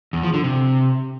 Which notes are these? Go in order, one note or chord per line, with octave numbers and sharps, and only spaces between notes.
E2
F3
D3
C3